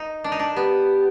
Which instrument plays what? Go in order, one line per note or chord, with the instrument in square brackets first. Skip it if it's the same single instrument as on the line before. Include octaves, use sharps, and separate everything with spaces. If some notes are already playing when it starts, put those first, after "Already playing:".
Already playing: [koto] D#4
D4
D#4
D4
[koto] B3 [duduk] G4